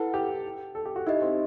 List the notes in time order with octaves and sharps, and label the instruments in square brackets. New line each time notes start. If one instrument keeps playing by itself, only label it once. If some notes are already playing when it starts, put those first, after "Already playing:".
Already playing: [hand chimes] E4 B4 F#5 [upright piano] A4
[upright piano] G4
A4
G4
F#4
[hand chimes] D#4 G4 D#5 [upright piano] E4
[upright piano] C4